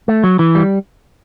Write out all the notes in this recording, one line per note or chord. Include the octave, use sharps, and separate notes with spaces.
A3
F#3
E3
G3